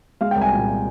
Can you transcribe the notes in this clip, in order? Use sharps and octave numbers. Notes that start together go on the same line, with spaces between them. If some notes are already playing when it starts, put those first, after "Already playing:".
G#3 F5
G5
C2
G#5
A#2